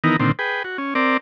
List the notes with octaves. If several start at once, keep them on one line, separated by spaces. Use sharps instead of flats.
D#3 E3 B3 D#4 A#4
A#2 D3 D#3 C4
G#4 B4 G5
F#4
C#4
C4 A#4 D5